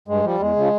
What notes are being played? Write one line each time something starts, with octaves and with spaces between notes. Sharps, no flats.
G2 G#3
F3 G3
E2 G#3
C#3 F3